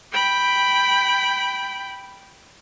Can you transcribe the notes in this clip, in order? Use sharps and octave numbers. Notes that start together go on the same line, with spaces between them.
G5 B5